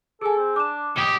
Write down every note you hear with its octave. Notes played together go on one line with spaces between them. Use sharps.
G#4 A4 G#5
C4
D4 D6 E7
B1 G4 D#6 G7